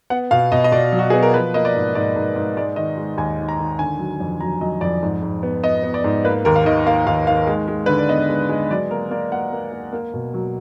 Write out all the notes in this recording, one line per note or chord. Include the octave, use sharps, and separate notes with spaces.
B3 F#5
B2 F5
B2 D#5
D#5
B2 D5
F#3
F#4
B3 G#4
A#4
F3 B4
A#3 D#5
D5
G#2
G#2 D5
G#2
G#2
G#3 D5
D#3 D#5
G#3
D#2 G#5
D#3
A#5
D#3
D3 G#5
F#3
F2
F#3 A#5
F#3 D#5
F2 D5
G#2
G#2
B3
B3 D#5
B3
D5
G#2
A#3 B4
D#2 A#4
F5
D#3 D#5
A#3 F5
D#2 F5
D#3 F5
G#3
G#3
D3 B4
D5
B3 D#5
G#3
G#3
F#3 D5
A#3 A#4
A#3 D5
A#3 F#5
A#3
A#3
A#3
B2
F#3